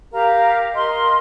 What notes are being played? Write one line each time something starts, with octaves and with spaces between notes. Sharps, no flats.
G4 A#4 F5 A#5
A#4 D#5 C6